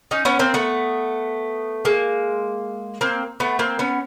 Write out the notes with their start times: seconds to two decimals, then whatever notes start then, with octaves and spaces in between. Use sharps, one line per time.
0.11 C#4 D#4
0.25 B3 C#4
0.39 A#3 C4
0.54 A3 B3
1.85 G#3 A#3
3.01 A#3 C4
3.40 A3 B3
3.59 A#3 C4
3.79 B3 C#4